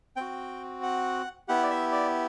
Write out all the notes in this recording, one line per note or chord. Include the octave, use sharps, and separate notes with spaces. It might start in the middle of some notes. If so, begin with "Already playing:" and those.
C4 F#4 G5
F#5
B3 E4 G4 F#5
D5
E5
D5